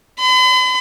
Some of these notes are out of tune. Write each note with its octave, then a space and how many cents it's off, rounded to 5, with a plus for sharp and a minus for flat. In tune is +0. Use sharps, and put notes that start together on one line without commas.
B5 +45